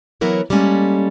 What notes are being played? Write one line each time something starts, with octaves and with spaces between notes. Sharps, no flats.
E3 F#3 B3 E4 A#4 C#5
G3 G#3 A#3 C#4 A4